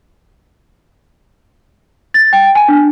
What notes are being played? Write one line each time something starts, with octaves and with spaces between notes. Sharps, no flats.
A6
G5
G#5
D4